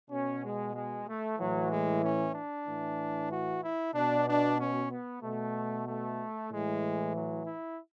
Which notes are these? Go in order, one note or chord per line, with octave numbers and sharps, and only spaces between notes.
B2 C#4
G#3
G#3
A3
A2 E3 F#3
G#3
C#4
D4
A2 E3
F#4
E4
B2 D4
D4
C#4
B3
B2 A3
A3
A2 E3 G#3
F#3
E4